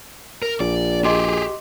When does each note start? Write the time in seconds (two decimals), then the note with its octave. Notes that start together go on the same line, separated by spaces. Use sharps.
0.42 A#4
0.60 A#1 D5
1.04 G4 G#4 D#5 C6 D6